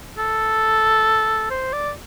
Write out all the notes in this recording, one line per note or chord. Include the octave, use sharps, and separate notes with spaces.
A4
C5
D5